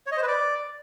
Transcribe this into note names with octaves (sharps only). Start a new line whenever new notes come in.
C#5
D#5
C5
B4
D5